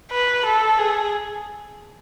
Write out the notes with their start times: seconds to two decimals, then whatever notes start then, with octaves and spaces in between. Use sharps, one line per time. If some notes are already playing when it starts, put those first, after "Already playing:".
0.11 B4
0.45 A4
0.79 G#4